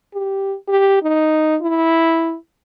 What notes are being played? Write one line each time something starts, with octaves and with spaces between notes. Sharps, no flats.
G4
G4
D#4
E4